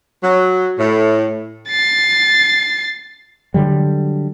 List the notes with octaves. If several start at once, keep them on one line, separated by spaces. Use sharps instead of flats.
F#3
A2
A6 C7
D3 F#3 G3